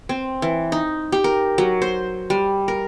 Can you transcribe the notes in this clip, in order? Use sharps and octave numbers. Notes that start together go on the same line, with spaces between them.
C4
E3
D#4
G4
A#4
F#3
C5
G3
A#4